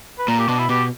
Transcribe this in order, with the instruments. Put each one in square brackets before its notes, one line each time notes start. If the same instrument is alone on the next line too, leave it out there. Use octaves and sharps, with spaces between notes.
[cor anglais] B4
[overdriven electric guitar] A#2 [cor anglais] A#4
[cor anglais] G4
[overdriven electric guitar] B2 [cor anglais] D4
[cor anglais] E4
[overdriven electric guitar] B2 [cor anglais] G4